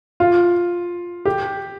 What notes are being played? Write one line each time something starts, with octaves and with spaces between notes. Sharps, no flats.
F4
G4